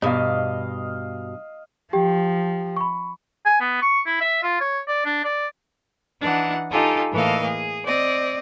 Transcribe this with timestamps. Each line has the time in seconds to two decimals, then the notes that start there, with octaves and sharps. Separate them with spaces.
0.02 G2 B2 D#5 F5
1.93 F3 G4 G5
2.77 B5 C#6
3.46 G#5
3.60 B3
3.82 C#6
4.06 E4
4.21 E5
4.43 F4
4.61 C#5
4.87 D5
5.05 D4
5.24 D5
6.21 E3 D4 D#4 F#5
6.71 D#4 F4 G4 A4 G#5 A5
7.13 A2 E3 A#3 A4 D#5 F5
7.45 G#4
7.86 C4 D5 D#5